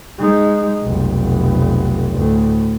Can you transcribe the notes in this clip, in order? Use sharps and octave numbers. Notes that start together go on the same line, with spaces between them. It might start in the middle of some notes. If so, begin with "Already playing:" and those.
G#3 D#4
F1 B1
D2 A2